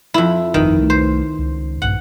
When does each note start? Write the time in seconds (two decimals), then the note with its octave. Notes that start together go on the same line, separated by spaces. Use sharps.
0.14 F2 E4
0.54 G1 F2 D#3 F3
0.78 C2 A3
0.90 C5
1.38 C#2
1.82 A#1 G2 F#5